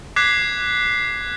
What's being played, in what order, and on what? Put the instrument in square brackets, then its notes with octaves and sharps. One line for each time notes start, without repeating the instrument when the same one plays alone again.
[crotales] D6 F#6 G#6 B6 C7